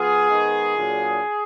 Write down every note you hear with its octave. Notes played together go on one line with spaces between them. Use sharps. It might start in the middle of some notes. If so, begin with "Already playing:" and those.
Already playing: F3 B3 F4 G#4
D#3 G#3 B3
A#2 F#3 D4 F4